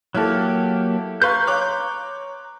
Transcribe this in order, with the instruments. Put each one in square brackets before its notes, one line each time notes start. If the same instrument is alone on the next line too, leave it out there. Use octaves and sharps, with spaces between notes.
[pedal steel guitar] F#3 A#3 G4 [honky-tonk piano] E4 A4
[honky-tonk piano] B4 F5 C#6 [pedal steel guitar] A#5 C6 G6
[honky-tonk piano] C#5 D6 F#6